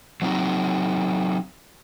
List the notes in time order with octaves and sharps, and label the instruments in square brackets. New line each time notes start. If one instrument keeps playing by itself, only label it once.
[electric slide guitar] F#3 C4 D#4